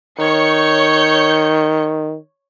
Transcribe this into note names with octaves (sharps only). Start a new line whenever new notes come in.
D#3 C#5 G6 C#7